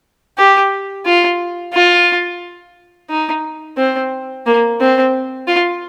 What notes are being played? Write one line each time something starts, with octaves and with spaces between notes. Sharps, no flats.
G4
F4
F4
D#4
C4
A#3
C4
F4